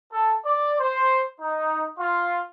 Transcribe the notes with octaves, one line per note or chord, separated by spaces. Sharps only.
A4
D5
C5
D#4
F4